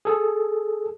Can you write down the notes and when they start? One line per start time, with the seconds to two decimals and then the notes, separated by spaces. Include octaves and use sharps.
0.05 G#4 A4